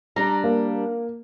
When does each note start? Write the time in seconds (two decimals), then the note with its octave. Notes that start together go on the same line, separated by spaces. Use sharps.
0.16 G3 D4 A#5
0.44 A#3